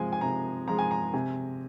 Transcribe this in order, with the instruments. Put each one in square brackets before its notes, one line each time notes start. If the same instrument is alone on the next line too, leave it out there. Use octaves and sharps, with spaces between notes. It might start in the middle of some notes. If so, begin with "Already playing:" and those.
Already playing: [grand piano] C3 F3 G#3 G#5
G#5
C3 A#5
F3 G#3 A#5
G#5
A#5
C3 G#5